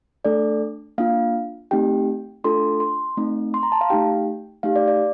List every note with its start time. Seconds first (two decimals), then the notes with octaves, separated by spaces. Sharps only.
0.25 A3 D4 A4 D5
0.98 A#3 D4 F4 F5
1.71 A3 C4 D#4 G4 G5
2.44 A3 D4 F4 A4 C6
2.80 C6
3.17 A3 C4 D#4
3.54 C6
3.63 A#5
3.72 A5
3.81 F5
3.90 A3 D#4 G4 G5
4.63 A3 D#4 G4 F5
4.76 D5
4.88 D5